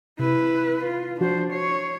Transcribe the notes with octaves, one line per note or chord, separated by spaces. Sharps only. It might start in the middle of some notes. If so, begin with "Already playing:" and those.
C3 E4 B4
F4
F3 D4 F#4 C5
C#5 C7